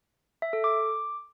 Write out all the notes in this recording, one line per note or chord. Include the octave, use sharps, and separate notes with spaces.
E5
A4
D6